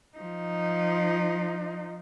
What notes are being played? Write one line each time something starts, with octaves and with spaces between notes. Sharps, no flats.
F3 D#4